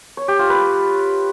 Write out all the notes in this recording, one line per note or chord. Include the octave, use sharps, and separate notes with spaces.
C#5
G4
F4
B4